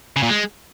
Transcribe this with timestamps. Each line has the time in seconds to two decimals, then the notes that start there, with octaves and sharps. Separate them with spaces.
0.16 C#3
0.23 A#2
0.29 G#3